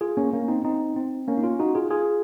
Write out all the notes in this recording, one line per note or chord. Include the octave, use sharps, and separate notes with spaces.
F4 G#4
A#3 C#4
A#3 C#4
C4 D#4
C4 D#4
C4
A#3 C#4
D#4
C#4 F4
D#4 F#4
F4 G#4
F4 G#4